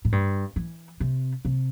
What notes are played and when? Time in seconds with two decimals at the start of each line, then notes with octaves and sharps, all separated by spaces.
0.05 A2
0.12 G2
0.56 E3
1.00 C3
1.45 C3